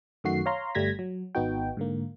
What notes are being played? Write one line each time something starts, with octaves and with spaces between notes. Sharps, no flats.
F#2 D#3 A3 F#4 C7
C#5 F5 A#5 C6
G1 G3 A3 G#6 A#6 B6
F#3
G#1 B3 D#4 F#4 G5
G#2 D3 A#3